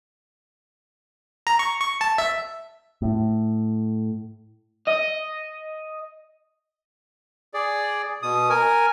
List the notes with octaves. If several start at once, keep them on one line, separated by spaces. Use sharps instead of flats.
A#5
C#6
C#6
A5
E5
A2
D#5
G#4 D5
B2 D#6
A#4 G#5